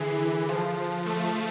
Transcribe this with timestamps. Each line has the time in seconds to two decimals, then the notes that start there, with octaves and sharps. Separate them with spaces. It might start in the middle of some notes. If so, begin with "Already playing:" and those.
Already playing: D3 E3 G#4
0.48 F3
0.77 F3
1.06 A3